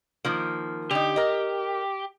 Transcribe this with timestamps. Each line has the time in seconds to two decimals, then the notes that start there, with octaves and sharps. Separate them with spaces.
0.25 D#3 F3 A#3
0.91 D3 D#4 G4
1.16 A#4 D#5